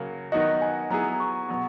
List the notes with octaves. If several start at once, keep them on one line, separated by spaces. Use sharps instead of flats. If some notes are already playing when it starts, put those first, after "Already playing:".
Already playing: C#3 F#3 A#3
D#3 F#3 B3 D#4 F#4 D#5
G#5
F#3 B3 E4 G#4 A#5
C#6
B2 F#3 B3